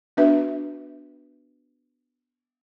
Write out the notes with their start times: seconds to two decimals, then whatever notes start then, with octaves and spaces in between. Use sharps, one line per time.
0.17 B3 D4 F#4 B4 E5